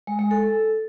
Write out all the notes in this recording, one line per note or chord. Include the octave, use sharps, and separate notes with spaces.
G#3
G#3
A4